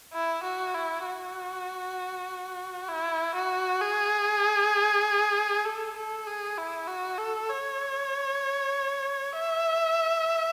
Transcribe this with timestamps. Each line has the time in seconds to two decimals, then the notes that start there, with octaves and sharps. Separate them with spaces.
0.13 E4
0.43 F#4
0.74 E4
1.05 F#4
2.89 E4
3.35 F#4
3.81 G#4
5.65 A4
5.96 A4
6.27 G#4
6.58 E4
6.87 F#4
7.18 A4
7.50 C#5
9.33 E5